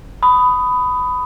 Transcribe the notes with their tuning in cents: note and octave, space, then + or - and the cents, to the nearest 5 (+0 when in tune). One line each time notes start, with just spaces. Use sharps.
B5 +15 D#6 +0